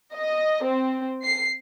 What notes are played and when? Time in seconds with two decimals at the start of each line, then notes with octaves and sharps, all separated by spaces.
0.15 D#5
0.64 C4
1.23 C7